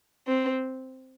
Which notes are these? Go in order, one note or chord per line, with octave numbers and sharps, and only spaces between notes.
C4